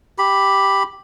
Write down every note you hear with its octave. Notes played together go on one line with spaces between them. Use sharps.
G4 B5